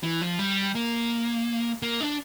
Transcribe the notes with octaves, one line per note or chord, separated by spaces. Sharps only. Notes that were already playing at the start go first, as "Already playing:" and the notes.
E3
F3
G3
A#3
A#3
D4